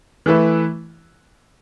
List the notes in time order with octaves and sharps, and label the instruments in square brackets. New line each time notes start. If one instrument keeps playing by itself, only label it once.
[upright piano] E3 A3 E4 B4